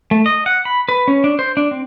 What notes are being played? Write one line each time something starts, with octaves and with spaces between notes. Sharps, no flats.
A3
D#5
F#5
B5
B4
C#4
D4
C5
D4
C4